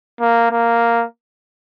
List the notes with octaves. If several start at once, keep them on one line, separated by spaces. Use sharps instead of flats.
A#3
A#3